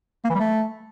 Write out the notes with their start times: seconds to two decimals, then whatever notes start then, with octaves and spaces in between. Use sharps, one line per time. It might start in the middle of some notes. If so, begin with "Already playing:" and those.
0.25 A#3
0.30 E3
0.35 G3
0.40 A3